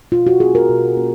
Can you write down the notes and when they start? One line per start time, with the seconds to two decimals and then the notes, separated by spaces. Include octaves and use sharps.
0.12 B2 F4
0.27 F#4
0.40 A#3 C#4 G#4
0.55 A#4
0.69 B2
0.97 A#3 C#4